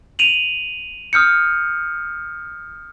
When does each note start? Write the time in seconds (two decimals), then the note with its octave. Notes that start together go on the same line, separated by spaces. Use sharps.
0.19 D#7 F7 F#7
1.13 D#6 F6 G6 C#7